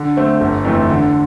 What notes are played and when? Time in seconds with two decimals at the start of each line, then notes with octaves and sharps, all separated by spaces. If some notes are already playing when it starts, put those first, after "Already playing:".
Already playing: D3
0.17 A3 C4
0.41 G1
0.65 F2 E3 A3
0.90 D3